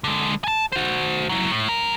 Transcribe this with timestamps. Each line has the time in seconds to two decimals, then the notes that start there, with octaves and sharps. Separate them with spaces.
0.04 D3 G#3
0.44 G#5 A5
0.72 F#4 C5
1.29 F#3 E4
1.52 A2
1.68 F#2 A#4